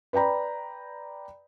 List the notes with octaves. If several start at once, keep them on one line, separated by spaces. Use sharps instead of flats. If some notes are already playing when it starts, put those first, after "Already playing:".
B4 D5 G5 A#5 B5